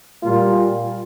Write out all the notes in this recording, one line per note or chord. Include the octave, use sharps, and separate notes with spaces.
A#2 G3 A#3 F4